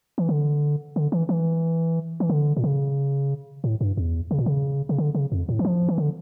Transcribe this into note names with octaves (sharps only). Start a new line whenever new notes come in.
E3
D3
D3
E3
E3
E3
D3
A#2
C#3
A2
G2
E2
C#3
A#2
C#3
C#3
D3
C#3
F2
A2
E3
F3
E3
D3